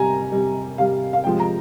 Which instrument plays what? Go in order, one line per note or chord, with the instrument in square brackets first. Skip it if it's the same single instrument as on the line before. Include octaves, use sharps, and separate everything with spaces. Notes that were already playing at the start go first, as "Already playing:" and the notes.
Already playing: [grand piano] C3 G3 G#5 A#5
C3 G3
C3 G3 F5
F5
C3 F3 G#3 G5
A#5